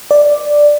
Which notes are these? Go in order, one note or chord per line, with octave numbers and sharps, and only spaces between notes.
D5